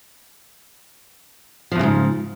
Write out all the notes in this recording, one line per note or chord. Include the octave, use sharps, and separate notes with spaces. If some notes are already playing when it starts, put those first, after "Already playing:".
E2 G#2 C#3 F3